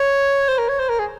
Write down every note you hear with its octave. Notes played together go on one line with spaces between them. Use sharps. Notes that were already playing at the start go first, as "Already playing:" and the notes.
Already playing: C#5
C5
A#4
C#5
C5
A#4
G#4